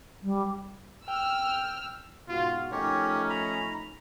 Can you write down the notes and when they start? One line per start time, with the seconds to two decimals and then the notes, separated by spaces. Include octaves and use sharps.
0.23 G3
1.08 G5 E6 F6
2.29 G#2 B2 F4 F#4
2.71 F3 A3 C#4 D#4 G4 A#4 C#5
3.29 A#5 B5